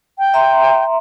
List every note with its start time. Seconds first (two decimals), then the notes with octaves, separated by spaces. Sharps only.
0.19 G5
0.34 E5 A#5 C6